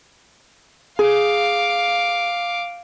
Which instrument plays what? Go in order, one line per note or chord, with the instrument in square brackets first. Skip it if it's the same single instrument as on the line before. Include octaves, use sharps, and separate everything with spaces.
[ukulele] G#4 [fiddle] F5 D6